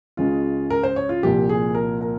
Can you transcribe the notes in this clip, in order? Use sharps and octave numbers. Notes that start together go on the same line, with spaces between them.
C#2 C#3 G#3 F4
A#4
C5
C#5
F4
C2 A#2 F3 G4
G#4
A#4
A#4